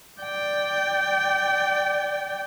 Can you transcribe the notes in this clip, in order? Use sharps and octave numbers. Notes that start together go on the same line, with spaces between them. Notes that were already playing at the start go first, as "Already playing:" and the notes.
D5 G5